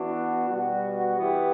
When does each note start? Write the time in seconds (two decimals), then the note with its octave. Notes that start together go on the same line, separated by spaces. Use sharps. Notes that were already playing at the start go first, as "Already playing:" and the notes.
Already playing: E3 B3 D4 F#4
0.48 B2 G3 B3 F#4
1.17 E3 B3 E4 G4